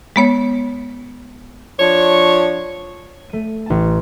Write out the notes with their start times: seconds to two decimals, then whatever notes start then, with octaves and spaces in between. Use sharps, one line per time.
0.16 G#3 B3 C#5
1.79 F3 D4 C#5
3.29 A3 D#7
3.66 A1 A5